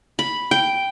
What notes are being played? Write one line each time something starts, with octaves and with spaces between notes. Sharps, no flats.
B5
G5